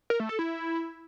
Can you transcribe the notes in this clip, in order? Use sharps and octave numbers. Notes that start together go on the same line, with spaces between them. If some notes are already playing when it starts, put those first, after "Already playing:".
A#4
A3
A4
E4